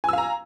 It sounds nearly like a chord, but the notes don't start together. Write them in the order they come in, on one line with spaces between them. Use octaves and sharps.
G#5 E6 F5 A#5